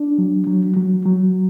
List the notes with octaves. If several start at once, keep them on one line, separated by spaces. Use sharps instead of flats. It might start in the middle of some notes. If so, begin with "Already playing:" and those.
Already playing: D4
F#3
F#3
F#3
F#3